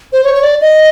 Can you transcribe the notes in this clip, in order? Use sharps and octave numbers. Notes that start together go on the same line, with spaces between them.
C5
C#5
C#5
D5
D#5